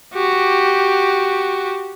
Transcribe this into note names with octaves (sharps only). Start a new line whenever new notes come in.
F#4 G4